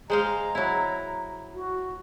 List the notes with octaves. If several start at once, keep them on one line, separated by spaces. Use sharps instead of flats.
G#3 C5 F5 A#5
F#3 E4
F#4